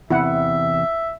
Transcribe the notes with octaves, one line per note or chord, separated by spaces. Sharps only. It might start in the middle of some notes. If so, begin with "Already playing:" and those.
E2 C3 E4 E5 F#5